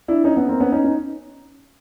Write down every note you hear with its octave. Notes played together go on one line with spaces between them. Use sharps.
D4 E4
C#4 D#4
B3 C#4
A#3 C4
B3 C#4
C#4 D#4
C#4 D#4